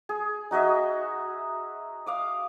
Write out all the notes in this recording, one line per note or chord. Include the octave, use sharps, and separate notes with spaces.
G#4
D#4 F#4 D#5 E5
F5 D6 D#6